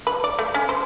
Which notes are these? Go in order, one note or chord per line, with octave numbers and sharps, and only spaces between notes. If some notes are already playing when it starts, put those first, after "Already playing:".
B4
D5
A3
C#4
C5